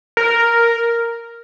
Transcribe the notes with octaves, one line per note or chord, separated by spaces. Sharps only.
A#4